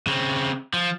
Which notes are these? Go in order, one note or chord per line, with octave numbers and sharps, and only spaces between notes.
C#3 C4
F3